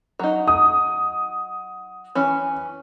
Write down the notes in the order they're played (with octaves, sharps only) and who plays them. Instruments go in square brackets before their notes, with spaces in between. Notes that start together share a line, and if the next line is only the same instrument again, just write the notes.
[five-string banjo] F#3 D#4
[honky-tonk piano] D#6
[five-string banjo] E3 C#4